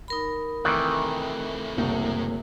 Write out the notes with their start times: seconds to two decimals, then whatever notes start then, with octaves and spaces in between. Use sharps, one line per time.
0.08 D#4 A#4 B5
0.65 C3 D#3 E3 A3 F#6
1.77 F#1 C2 A2